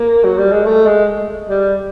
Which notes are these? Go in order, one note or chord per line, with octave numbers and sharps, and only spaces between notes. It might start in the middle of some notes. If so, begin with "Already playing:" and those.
Already playing: A#3
F#3
G3
G#3
A3
G#3
G3